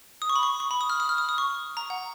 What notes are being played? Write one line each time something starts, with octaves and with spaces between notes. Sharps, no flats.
D#6
C#6
B5
C#6
C#6
B5
D#6
F6
D#6
F6
D#6
D#6
C#6
A#5
F#5